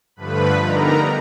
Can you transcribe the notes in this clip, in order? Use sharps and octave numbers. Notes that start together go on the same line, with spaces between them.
G2 D3 F3 A3 B4 B5
D3 G3 B3 D#4 A#4 A#5